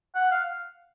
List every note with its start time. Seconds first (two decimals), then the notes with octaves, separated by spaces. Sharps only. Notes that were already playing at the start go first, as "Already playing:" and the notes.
0.15 F#5
0.31 F5